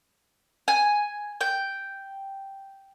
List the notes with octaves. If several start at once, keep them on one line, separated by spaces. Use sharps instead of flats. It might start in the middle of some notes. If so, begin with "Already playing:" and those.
G#5
G5